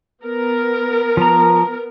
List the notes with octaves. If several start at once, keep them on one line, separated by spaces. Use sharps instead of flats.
B3 A#4
F3 A#5